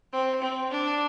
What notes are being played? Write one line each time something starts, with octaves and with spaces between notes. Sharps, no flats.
C4
C4
D4